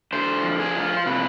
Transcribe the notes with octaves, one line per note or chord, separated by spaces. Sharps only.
D3 C5
F3
G#4
F4
C5
C3 B4